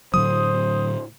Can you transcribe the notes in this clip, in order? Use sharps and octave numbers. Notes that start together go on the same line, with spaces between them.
A2 D3 F#3 C5 D#6